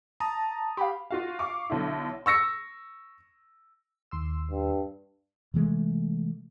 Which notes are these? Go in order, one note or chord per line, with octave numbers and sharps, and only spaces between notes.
A5 A#5 D#6
G4 F5 B5
F4 F#4 F5
F5 C#6 D6
B1 D3 E4
C#6 E6 A#6 C#7
D#2 C6 E6
G2
C3 E3 G#3 A3